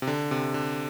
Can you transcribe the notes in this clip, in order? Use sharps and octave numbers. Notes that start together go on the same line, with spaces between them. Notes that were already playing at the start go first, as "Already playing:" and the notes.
C3
D3
C3
D3